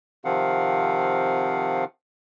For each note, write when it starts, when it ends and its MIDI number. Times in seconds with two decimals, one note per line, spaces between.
0.25 1.84 48
0.25 1.84 51
0.25 1.84 53
0.25 1.84 60
0.25 1.84 77
0.25 1.84 78